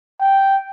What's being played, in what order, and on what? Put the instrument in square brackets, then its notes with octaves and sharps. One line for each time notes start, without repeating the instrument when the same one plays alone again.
[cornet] G5